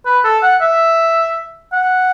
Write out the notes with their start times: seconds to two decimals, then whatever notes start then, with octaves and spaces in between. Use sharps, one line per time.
0.06 B4
0.25 A4
0.43 F#5
0.61 E5
1.73 F#5